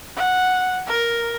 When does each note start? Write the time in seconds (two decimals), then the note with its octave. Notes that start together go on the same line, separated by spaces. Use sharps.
0.17 F#5
0.87 A#4